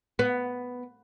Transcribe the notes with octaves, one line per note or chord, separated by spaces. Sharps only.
B3